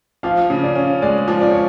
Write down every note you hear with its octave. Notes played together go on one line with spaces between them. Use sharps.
F3 F5
C#3
D5
C#4
G#3 D5
F3
D5
C#5